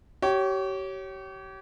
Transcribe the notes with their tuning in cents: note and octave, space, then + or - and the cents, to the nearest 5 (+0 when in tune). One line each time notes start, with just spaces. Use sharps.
G4 -35 C#5 +0